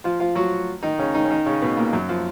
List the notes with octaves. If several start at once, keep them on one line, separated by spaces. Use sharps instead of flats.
F3 F4
F3 F4
F#3 F#4
D#3 D#4
C#3 C#4
D#3 D#4
C#4
D#3 D#4
C#3 C#4
B2 B3
A#2 A#3
F#2 F#3
F3